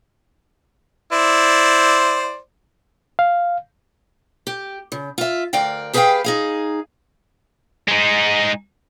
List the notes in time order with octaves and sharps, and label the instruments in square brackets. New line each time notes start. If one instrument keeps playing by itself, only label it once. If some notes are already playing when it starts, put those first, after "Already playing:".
[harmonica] E4 C5 D5
[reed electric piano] F5
[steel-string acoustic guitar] G4
C#3
F4 E5
D2 A#4 D5 F5 G5
G4 G#4 B4 D#5 F5 G5
D#4 G#4 F5
[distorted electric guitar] G#3 D#4